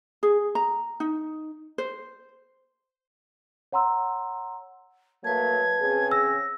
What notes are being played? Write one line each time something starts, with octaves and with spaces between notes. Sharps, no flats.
G#4
A#5
D#4
C5
C#5 F#5 A#5 C6 E6
F#3 A3 A#3 B4 A5 G#6
C#3 C4 G#4
E6 A#6